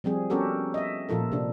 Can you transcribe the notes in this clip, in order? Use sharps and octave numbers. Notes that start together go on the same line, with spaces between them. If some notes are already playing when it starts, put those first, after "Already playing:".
F3 G3 C4 G#4
B3 C#4 F#4 G4 A4 A#4
D#5 E5
A#2 F3 F4 A4 A#4
C3 D4